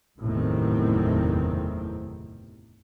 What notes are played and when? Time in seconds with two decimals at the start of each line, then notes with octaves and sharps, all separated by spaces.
0.21 F#1 E2 A2 C3 D#3 C4